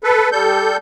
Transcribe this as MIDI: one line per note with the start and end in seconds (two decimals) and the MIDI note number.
0.04 0.30 69
0.04 0.30 71
0.32 0.77 55
0.32 0.77 69
0.32 0.77 91